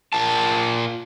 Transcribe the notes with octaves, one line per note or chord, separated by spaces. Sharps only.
A#2 A5